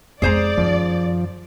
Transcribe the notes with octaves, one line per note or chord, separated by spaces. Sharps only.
F2 G#3 G#4 C5 D5 A#5
F#2 D#3 F3